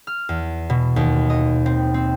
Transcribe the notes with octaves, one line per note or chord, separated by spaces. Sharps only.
F6
E2
B2
D#2
D#5
C4
C4